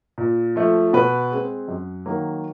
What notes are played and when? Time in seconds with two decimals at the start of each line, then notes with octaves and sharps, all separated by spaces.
0.18 A#2
0.56 F3 A3
0.93 B2 B4
1.32 G#3 C4
1.68 F#2
2.06 D#3 F#3 A#3